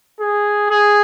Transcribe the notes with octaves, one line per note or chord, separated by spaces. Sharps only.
G#4
G#4